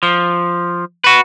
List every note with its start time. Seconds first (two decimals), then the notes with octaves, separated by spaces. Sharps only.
0.03 F3
1.04 F#4 B4